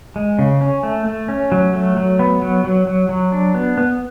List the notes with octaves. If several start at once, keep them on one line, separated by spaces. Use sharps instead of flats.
G#3
C#3
C#4
A3
A3
C#4
F#3
A3
F#3
B3
F#3
F#3
F#3
F#3
D4
B3
B3